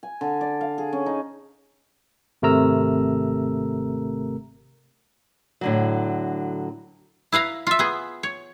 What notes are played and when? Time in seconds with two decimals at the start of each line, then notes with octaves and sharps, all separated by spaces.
0.03 G#5
0.21 D3
0.41 D5
0.61 F5
0.78 G#4
0.93 C#4
1.06 D#4
2.42 G#1 C3 A3 A#4 A#5 E6
5.61 A2 D3 F#3
7.32 E4 B4 F5 A#5
7.67 F4 E5
7.79 B3 G#4
8.23 C#5